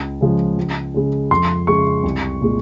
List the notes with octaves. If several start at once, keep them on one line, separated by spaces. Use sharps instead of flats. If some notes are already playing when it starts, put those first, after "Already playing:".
Already playing: C#2
C#3 F3 G#3
C#2
C#3 G#3
F2 C6
C#3 G#3 C#6
C2
A#2 G#3